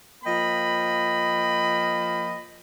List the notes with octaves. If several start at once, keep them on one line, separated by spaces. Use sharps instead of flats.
F3 A#3 D#5 G5 B5